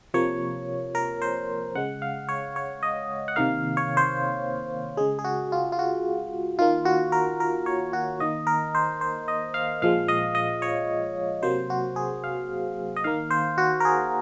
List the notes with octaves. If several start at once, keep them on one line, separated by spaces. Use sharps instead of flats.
C3 F3 A#3 C#5
A#4
C5
C#3 G#3 F#5
F5
C#5
C#5
D#5
F#5
C3 D#3 A#3 F5
C#5
C5
C#3 G#3 G#4
G#4
F#4
F4
F4
F#4
D#3 A#3 F4
F#4
A#4
A#4
C#5
F#4
D#3 A#3 D#5
A#4
C5
C5
D#5
F5
A#2 F3 G#3 F5
D#5
D#5
C#5
C3 F#3 A#3 C5
F#4
G#4
F5
D#5
D#3 A#3 F5
C5
F#4
A#4
G#4